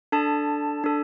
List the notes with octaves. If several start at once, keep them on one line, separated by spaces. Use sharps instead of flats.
D4 A4 A5
D4 A4